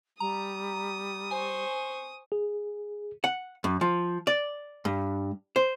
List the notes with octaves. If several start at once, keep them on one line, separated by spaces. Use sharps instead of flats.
G3 A#5 D#6
C5 G#5 C#6
G#4
F#5
F#2
F3
D5
G2
C5